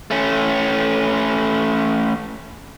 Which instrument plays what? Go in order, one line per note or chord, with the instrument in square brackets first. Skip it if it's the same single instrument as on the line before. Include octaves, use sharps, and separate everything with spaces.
[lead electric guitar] A3 C#4